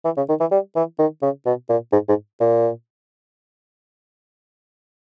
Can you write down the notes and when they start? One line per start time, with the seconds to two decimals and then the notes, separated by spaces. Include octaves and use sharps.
0.05 E3
0.17 C#3
0.29 D#3
0.40 E3
0.51 G3
0.75 E3
0.98 D#3
1.22 C#3
1.46 B2
1.69 A#2
1.92 G#2
2.08 G#2
2.40 A#2